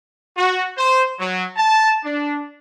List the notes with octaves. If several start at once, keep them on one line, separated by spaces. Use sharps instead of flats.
F#4
C5
F#3
A5
D4